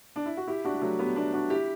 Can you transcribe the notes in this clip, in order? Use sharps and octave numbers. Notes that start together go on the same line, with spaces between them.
D4
E4
F#4
E4 G4
D4 F#4
G3
F#3 A3
G3 B3
B3 D4
D4 F#4
E4 G4